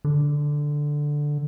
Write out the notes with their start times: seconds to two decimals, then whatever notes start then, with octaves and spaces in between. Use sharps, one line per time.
0.05 D3